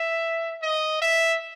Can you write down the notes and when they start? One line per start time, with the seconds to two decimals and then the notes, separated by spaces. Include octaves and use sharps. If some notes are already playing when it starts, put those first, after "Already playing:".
Already playing: E5
0.62 D#5
1.01 E5